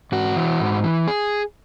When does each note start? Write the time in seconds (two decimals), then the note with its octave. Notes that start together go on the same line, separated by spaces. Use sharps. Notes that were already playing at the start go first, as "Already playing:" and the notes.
0.12 G#2 F#4
0.36 E3
0.60 G#2
0.84 E3
1.08 G#4